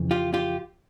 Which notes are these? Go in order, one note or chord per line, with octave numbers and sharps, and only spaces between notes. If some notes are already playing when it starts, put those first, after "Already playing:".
Already playing: F2 C#3 E3
F4 G4
F4 G4